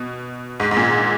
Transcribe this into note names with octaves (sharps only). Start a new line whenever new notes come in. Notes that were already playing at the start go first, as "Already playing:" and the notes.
Already playing: B2
G#2
G#2
A#2